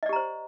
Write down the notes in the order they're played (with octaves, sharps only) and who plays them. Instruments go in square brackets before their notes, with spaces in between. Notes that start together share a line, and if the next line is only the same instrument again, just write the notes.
[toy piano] D#5
D5
G4
A#5
C5